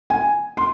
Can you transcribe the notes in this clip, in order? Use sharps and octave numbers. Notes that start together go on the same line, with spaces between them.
G#5
C6